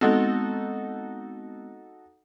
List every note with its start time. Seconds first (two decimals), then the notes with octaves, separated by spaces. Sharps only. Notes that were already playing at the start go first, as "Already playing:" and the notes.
0.01 G#3 B3 C4 D#4 F#4 A4